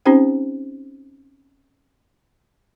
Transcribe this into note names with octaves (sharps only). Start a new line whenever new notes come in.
C4 C#4 D#4 G4 C5 G5